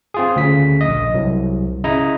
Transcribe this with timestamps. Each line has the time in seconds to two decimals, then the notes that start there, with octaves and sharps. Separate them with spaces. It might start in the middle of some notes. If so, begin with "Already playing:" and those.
0.14 C4 F4 G#4
0.36 D2 C#3 B6
0.81 A#1 D#5
1.14 C2 F#3
1.84 C#3 E4 D#5 A#5